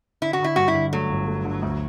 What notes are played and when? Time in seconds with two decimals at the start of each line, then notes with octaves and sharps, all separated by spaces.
0.22 D3 E4
0.33 F#4
0.39 D3
0.44 E4
0.56 G2 F#4
0.68 E4
0.74 D3
0.92 F#3 A3
1.10 G1
1.27 A3
1.45 D3
1.62 D2